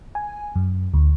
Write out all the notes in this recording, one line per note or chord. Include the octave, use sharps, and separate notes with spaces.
G#5
F#2
D2